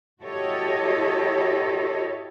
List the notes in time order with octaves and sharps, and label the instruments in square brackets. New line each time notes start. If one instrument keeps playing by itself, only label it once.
[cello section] E4 F#4 G4 A4 C#5 D#5